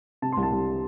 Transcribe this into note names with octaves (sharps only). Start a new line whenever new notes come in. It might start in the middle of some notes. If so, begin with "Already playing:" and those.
C3 A5
C2 C6
A5
C2